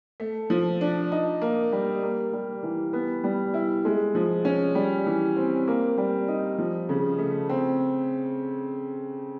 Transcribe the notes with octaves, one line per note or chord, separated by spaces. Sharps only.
A3
F3
D4
D#4
A#3
G3
A#3
G3
E3
B3
G3
E4
G#3
F3
C#4
G3
E3
C4
A#3
G3
D#4
F3
C#3
A3
C4